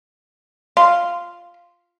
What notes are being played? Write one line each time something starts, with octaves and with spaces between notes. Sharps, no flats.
F4